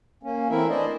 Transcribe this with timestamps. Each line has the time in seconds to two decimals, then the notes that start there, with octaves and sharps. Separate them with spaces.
0.23 A#3 C#4
0.50 E3 A3 C4 E4 A#4 E5
0.69 D4 C5 D5 D#5